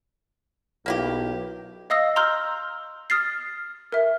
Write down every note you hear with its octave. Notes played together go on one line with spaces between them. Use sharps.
B1 A#3 E4 G4
D#5 F5 D#6 E6 A#6
A#5 C6 E6 F6 G6
D#6 F6 A6 C7
A#4 E5